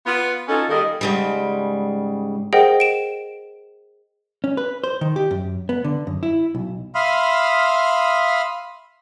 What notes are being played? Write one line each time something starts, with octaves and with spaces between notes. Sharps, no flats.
B3 F4
C#4 D#4 F4 F#4 A4
D#3 G3 A#3 G#4 A4 D#5
G#2 C#3 G3
G#4 A#4 C5 D#5 F#5 G5
D7 E7
C#4
B4
C5
D#3
G4
F#2
B3
D3
F#2
E4
B1
E5 F5 B5 C6 D#6 F6